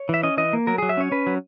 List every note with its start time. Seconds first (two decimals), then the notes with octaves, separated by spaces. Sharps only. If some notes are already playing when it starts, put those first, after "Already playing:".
Already playing: C#5
0.09 E3 E5
0.23 C#4 D#5
0.37 E3 D#5
0.53 A#3
0.67 F#3 A#4
0.78 F#3 G#4
0.89 E5
0.97 C#4 C#5
1.12 C#4 B4
1.27 F#3